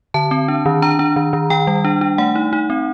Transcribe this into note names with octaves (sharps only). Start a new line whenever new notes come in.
D3 A5
C4
D4
D#3
D4 A#5
D4
D#3
D#3
D#3 G5
G3
D4
D4
A3 F#5
D#4
D#4
C4